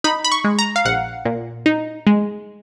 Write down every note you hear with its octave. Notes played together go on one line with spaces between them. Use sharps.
D#4 B5
B5
C#6
G#3
A#5
F5
A#1 F#5
A#2
D#4
G#3